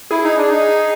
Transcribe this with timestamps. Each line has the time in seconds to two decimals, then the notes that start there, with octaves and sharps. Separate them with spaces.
0.11 E4 G#4
0.24 D#4
0.37 D4
0.50 D#4